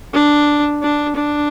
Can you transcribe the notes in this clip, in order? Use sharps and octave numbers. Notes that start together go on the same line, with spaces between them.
D4
D4
D4